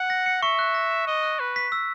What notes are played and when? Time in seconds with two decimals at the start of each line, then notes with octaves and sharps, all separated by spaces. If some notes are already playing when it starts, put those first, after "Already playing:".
Already playing: F#5
0.10 A#6
0.26 C#7
0.42 E5 C#6
0.59 F#6
0.74 A#6
0.91 E7
1.07 D#5 C#6
1.23 F#6
1.39 B4 F#6
1.56 B6
1.72 E6